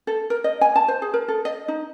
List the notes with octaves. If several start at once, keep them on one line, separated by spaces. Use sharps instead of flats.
A4
A#4
D#5
G#5
A5
C5
G#4
A#4
A4
D#5
D#4